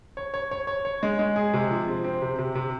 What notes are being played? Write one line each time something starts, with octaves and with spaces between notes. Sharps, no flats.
C#5
C#5
C#5
C#5
C#5
G#3
G#3
G#4
C3
F3
C4
C4
C3
C3
C3